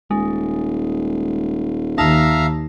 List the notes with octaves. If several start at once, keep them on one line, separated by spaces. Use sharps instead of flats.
D#1 G#3
D#2 D#4 E5 F5 A5 A#5